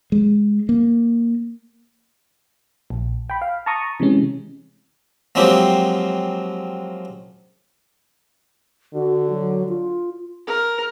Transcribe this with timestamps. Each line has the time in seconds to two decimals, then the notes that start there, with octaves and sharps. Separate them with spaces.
0.12 G#3
0.69 A#3
2.90 A#1
3.30 G5 B5
3.42 F5
3.66 A5 A#5 C#6 D#6
4.00 C3 E3 G#3 C#4
5.35 F3 F#3 G#3 A#3 C4 G4
8.94 D3 F#4
9.30 F#3
9.69 F4
10.47 A#4